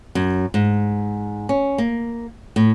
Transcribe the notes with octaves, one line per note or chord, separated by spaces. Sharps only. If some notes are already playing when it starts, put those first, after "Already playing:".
F#2
G#2
C#4
A#3
A2